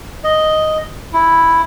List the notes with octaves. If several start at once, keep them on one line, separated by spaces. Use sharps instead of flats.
D#5
E4